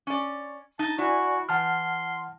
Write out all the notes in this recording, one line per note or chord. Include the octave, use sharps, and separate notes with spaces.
C#4 D5
D#4 A5
E4 F#4 D5 G#5
E3 F#5 A5 C6 F6